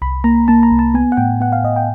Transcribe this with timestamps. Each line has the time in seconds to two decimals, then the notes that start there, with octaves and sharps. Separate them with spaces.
0.02 C2 B5
0.24 A#3 A#5
0.48 A#3 A5
0.63 A#5
0.71 C2
0.79 A5
0.94 B3 G#5
1.12 F#5
1.17 A2 G5
1.40 B3 F#5
1.52 F5
1.64 A2 D#5
1.76 G5